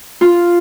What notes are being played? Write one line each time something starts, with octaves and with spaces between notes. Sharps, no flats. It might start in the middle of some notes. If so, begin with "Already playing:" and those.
F4